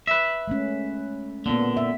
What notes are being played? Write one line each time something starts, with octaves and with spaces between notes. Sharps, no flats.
B4 E5
G#3 A3 C#4
A#2 D3 A#3 B3
E5